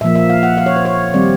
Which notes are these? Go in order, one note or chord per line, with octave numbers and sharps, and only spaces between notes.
A#2 F3 A#3 E5
E5
F5
F#5
F5
C#5
C5
C#5
D#3 G3 C4 D5